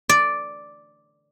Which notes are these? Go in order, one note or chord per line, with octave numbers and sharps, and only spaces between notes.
D5